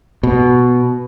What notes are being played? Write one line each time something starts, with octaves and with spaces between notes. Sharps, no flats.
B2